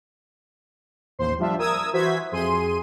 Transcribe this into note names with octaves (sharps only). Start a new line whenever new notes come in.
A1 D#2 C5 C6
F3 G3 D4 F4 E5
A#4 D#6 E6 G#6
E3 F#4 C5 E5 G#6 B6
F2 G#4 C6 D#7